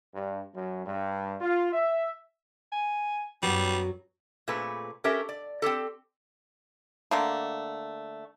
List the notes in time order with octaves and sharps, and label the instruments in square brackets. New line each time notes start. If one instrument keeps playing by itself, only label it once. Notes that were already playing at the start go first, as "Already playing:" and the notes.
[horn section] G2
F#2
G2
F4
E5
[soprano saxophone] G#5
[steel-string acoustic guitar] F#2 F#3 [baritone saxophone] G3 [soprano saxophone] B3
[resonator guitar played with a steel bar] A#2 A3 C4 G#4 B4
C#4 G4 A4 A#4 E5
D5
C4 F4 G4 A4
[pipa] D3 A3 A#3